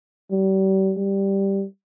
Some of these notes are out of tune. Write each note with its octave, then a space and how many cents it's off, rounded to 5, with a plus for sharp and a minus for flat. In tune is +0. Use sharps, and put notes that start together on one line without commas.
G3 -35
G3 +0